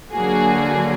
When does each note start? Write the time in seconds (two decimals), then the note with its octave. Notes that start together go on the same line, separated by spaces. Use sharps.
0.14 D3 F#3 A#3 F#4 G#4